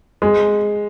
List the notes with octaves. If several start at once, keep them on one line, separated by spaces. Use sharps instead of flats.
G#3